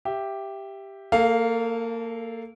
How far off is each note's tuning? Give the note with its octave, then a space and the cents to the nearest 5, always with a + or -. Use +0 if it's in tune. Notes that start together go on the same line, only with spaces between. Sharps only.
G4 +0 E5 +15
A#3 -25 A4 +0 F5 +0